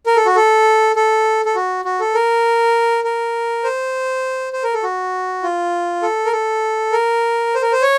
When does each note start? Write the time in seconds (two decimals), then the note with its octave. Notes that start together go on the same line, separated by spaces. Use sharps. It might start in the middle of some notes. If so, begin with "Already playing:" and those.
0.06 A#4
0.16 A4
0.26 F#4
0.36 A4
0.96 A4
1.45 A4
1.56 F#4
1.85 F#4
2.00 A4
2.14 A#4
3.04 A#4
3.64 C5
4.53 C5
4.64 A#4
4.74 A4
4.83 F#4
5.43 F4
6.03 A4
6.26 A#4
6.33 A4
6.92 A#4
7.55 C5
7.62 A#4
7.72 C5
7.82 C#5